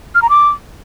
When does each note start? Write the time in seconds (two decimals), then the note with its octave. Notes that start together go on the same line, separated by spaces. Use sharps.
0.15 F6
0.22 A#5
0.30 D6